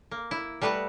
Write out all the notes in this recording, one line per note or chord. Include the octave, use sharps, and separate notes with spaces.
A#3
E4
G3 A3 B4 D#5 F#5